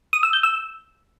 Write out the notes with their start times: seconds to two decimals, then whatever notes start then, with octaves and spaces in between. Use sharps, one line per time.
0.13 D#6
0.23 E6
0.33 G6
0.43 E6